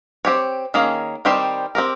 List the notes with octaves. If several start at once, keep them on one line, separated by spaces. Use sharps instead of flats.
C4 G4 C#5
D#3 A#3 C#4 G#4
D#3 G3 C4 G4 C5
C4 G4 A#4